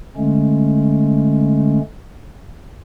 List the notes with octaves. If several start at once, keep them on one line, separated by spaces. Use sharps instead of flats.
D3 G#3 A3 C#4